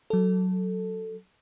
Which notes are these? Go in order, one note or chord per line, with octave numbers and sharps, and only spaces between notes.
F#3 A4